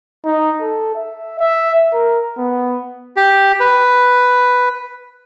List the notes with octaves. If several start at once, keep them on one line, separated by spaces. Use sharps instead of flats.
D#4
A4
E5
E5
A#4
B3
G4
B4